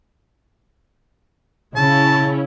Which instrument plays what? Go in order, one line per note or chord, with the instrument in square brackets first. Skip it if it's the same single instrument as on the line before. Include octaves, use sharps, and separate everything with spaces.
[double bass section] C#3 [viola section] C#4 E4 [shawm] A5